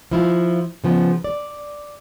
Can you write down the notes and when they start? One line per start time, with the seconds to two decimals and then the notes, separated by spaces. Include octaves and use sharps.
0.11 F3 E4 F4
0.84 C#3 F3 B3
1.24 D5